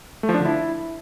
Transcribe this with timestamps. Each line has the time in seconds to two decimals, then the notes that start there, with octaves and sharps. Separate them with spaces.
0.23 A3
0.29 F3
0.34 D4
0.40 D3
0.45 E4